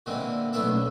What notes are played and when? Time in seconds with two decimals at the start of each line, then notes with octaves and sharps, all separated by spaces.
0.06 A#2 D3 E3 G#3 C4
0.53 B1 A3 B3 D4 E5
0.70 C#2